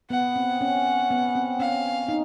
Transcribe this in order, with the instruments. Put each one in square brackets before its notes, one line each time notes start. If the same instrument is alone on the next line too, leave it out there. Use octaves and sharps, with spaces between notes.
[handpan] B3 [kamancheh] F#5
[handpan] C4
C#4
B3
C4
[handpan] C#4 [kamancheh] F5
[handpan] D#4